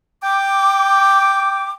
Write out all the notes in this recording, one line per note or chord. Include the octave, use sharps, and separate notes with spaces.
G5 D6